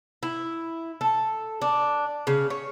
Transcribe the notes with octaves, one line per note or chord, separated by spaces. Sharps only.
E4
A4
D4
C#3
C#5